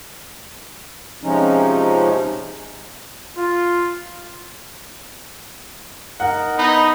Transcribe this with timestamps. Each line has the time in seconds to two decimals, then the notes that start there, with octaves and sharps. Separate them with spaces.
1.24 C3 F3 G#3 C#4 D#4
3.36 F4
6.20 D#4 A#4 F#5
6.58 B3 D#4 E4 B5